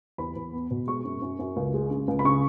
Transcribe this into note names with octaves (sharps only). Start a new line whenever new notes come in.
E2 B5
E2
B3
B2
G#3 C#6
F#2
F#2
F#2
C#2
G#3
C#3
C#2
B5
C#3 C#6